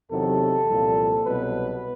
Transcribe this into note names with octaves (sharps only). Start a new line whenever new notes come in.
E2 C3 D#3 F#3 A4
C2 A#2 F3
C2 B2 F#3 B4